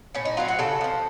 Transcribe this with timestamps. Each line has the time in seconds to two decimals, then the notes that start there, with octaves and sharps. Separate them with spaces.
0.14 A2 C#4
0.25 D#4
0.37 F#3 C4 F4
0.48 F#4
0.59 C#3 A4
0.81 F3 C4